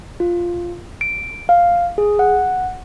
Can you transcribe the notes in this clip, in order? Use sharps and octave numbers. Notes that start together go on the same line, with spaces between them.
F4
D7
F5
G#4
F#5